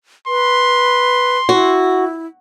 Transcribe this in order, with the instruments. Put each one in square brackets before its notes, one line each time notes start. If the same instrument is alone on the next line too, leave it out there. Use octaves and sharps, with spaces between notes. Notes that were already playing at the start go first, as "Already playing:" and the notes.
[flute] B4 [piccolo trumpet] C6
[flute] E4 [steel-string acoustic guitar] F#4